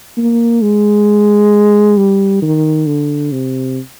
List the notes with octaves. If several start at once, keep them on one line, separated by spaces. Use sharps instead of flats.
A#3
G#3
G3
D#3
D3
C3